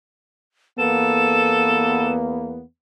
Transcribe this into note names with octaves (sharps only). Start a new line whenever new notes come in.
E2 A#3 B3 A4 E7